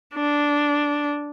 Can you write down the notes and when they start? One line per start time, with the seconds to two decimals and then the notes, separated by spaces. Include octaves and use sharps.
0.15 D4